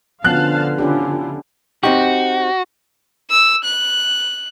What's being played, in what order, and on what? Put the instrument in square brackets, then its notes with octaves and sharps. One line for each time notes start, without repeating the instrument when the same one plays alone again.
[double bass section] D3 [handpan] F3 B3 C#4 [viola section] F5 A5 [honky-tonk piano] F#6
[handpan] C#4 D4 G4 [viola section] E4 F4
[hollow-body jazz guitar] C4 D#4 G4 [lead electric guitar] F#4
[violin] E6
F#6